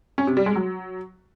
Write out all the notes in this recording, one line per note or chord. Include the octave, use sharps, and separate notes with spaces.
C#4
C3
G3
G#3
F#3